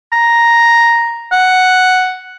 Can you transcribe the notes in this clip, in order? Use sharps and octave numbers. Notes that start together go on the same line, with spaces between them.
A#5
F#5